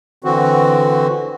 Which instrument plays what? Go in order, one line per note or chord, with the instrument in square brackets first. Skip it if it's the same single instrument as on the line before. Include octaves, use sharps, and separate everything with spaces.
[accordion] D3 E3 C4 F#4